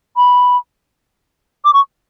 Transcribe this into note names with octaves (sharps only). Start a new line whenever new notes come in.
B5
D6
C#6